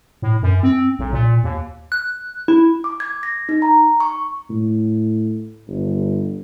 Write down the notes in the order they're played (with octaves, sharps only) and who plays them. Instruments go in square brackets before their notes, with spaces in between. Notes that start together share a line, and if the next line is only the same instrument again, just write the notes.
[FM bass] A2
F#2
C4
B1
A#2
D#2
[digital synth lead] F#6
E4
[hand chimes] D6
G#6
A#6
D#4
A#5
C#6
[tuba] A2
G1